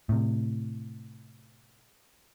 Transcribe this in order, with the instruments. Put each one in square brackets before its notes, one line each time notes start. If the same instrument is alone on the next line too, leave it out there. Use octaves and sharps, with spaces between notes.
[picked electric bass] A2 C3